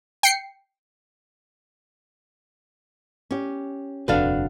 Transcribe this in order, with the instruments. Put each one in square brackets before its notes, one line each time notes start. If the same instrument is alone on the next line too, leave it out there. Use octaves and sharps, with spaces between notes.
[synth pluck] G5 C7 C#7
[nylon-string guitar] C#4 G4
[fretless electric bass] D#1 F2 C3 [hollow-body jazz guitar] D4 A4 B4 [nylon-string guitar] F#4 F5